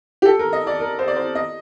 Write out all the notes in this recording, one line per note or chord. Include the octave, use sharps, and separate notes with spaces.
G4
A4
A#4
D#5
D5
A#4
C5
D5
C5
D#5